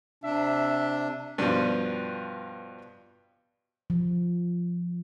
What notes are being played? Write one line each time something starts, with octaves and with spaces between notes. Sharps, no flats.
C3 D4 E5
G2 B2 F3
F3